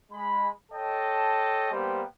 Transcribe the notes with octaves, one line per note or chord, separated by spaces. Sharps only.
G#3 B5
A4 C#5 D#5 G5 A5
G3 A#3 B3 G4 C5 G5